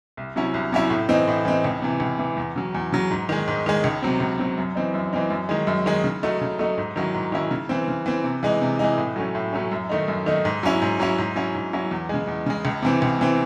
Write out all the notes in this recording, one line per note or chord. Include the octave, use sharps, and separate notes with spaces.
C2
C3 F#3 C#4 E4
C2
C3 F#3 C#4 E4
A2
E3 C4 D#4
A2
E3 C4 D#4
C#2
C3 E3
C#2
C3 E3
E2
C#3 F#3
E2
C#3 F#3
G#2
D#3 G#3
G#2
D#3 G#3
C#2
C3 F#3 C4
C#2
C3 F#3 C4
F#2
E3 C4 D#4
F#2
E3 C4 D#4
F#2
D#3 G#3
F#2
D#3 G#3
C#3
F#3 A3 D#4
C#3
F#3 A3 D#4
G#2
D#3 F#3 C#4 E4
G#2
D#3 F#3 C#4 E4
C#3
E3 C4
C#3
E3 C4
C3
E3 G#3 D#4
C3
E3 G#3 D#4
A2
F#3 A3 C#4
A2
F#3 A3 C#4
F#2
D#3 A3 D#4
F#2
D#3 A3 D#4
G#2
F#3 C#4 E4
G#2
F#3 C#4 E4
G#2
F#3 C#4 E4
G#2
F#3 C#4 E4
E2
C#3 G#3
E2
C#3 G#3
C#2
C3 E3 C4
C#2
C3 E3 C4